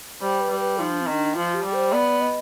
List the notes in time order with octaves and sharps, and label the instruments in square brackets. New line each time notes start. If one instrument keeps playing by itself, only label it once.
[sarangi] G3 [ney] C5
[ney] B4
[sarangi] G3
[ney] B4
[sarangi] F3 [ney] D#4
[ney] D4
C4
[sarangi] D#3
[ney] D4
[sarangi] F3 [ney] F4
[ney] G4
[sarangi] G3
[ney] C5
[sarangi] B3 [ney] D5
[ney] D#5